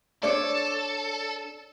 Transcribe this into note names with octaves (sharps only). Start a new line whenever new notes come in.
D4 A4 C#5 D5